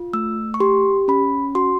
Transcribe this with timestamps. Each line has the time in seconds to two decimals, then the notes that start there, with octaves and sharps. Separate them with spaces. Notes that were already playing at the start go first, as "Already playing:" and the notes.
Already playing: F4
0.13 A3 E6
0.54 C#6
0.60 G4 C6
1.08 C#4 B5
1.55 F#4 C6